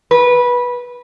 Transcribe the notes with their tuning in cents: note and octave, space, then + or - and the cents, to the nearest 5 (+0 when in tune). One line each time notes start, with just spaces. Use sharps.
B4 -15